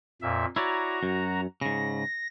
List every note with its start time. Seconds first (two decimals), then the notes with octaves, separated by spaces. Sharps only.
0.22 F2 A#2 E5
0.56 E4 F#4 C#5 D5 A#5
1.03 F#2
1.61 G#2 C#3 A#6